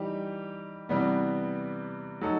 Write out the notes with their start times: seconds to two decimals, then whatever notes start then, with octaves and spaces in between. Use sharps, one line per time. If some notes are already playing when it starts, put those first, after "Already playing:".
Already playing: E3 G3 D#4 G4
0.89 C3 E3 G3 B3
2.21 F#3 A3 D#4 A4